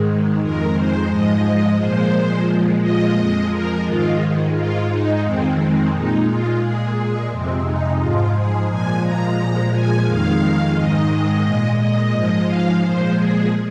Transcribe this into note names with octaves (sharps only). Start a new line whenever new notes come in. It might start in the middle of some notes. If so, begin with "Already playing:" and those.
Already playing: G#2 D#3 G#3
F2 D#3 G#3 A#4
C5
G#2 F3 G#3 D#5
A#2 F3 G#3 C5
A#2 F3 G#3
D#5
F2 F3 G#3
A#4
G#2 D#3 G#3 F4
G#2 G#3 F4
D#4
F2 D#3 G#3 C4
C4
A#2 G#3 D#4
F4
A#2 G#3 G#4
F2 C3 G#3 C4
D#4
G#2 F3 G#3 F4
G#4
A#2 F3 G#3 G#5
A#5
A#2 F3 G#3
G#5
F2 D#3 G#3 F5
G#2 D#3 G#3 D#5
A#2 G#3
D#5
G#2 F3 G#3 D#5
F5
A#2 F3 G#3 C5
G#4